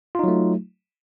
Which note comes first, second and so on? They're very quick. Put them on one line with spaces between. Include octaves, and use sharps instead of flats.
F4 D#4 F#3 A3